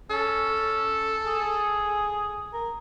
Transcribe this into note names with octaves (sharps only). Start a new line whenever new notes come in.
C#4 A4
G#4
A#4